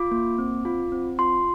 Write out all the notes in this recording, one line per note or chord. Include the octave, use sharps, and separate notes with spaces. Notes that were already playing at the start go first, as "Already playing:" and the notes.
Already playing: F4 D6
A#3
C4
F4
C4
F4 C6